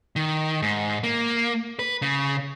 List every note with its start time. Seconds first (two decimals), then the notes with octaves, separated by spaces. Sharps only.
0.16 D#3
0.62 G#2
1.04 A#3
1.79 B4
2.02 C#3